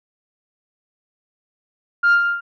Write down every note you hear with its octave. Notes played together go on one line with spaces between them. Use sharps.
F6